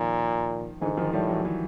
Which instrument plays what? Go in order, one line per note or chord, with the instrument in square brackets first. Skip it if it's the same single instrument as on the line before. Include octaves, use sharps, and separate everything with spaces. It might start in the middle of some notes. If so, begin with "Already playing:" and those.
Already playing: [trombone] A#2 [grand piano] D#3 F3
[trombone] G#2 [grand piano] D3 E3
[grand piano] D#3 F3
[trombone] A2 [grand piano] F3 G3
[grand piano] E3 F#3
E3 F#3